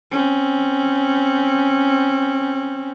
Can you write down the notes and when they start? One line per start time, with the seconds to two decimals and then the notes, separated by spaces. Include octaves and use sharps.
0.12 C4 C#4